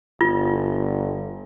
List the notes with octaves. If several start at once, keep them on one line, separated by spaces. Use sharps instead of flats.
G1 F4